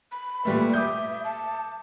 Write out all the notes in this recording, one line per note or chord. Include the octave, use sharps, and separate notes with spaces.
B5
A#2 G3 A3 B4
E5 D6 D#6 G6
A5